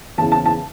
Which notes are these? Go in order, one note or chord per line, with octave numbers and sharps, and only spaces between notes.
E2 C#3 E3 A5
A5
A5